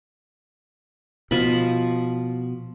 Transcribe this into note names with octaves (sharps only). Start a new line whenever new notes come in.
B2 F3 B5